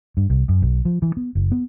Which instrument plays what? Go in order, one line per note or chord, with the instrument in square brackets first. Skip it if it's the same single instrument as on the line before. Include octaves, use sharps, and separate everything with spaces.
[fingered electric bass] G2
C2
F#2
B1
F3
E3
B3
F#1
B3